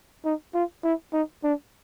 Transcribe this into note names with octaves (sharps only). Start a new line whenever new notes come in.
D#4
F4
E4
D#4
D4